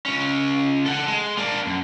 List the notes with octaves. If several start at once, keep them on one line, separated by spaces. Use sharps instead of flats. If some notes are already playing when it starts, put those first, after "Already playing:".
C#2 C#4
A4 F#5
G#3
A#3 D4
F#2